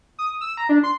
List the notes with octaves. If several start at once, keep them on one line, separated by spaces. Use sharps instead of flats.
D#6
E6
A#5
D4
C6